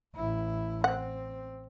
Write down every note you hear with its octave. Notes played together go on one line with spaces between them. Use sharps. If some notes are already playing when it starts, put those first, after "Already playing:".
A1 E4
C4 F#5